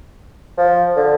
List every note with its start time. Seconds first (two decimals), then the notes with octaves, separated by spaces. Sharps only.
0.57 F3
0.96 D3